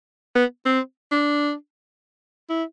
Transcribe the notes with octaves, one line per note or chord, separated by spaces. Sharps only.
B3
C4
D4
E4